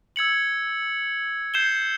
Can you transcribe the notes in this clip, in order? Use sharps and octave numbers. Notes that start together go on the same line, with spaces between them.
E6 G#6 C#7 F#7
G6 C7 E7 G7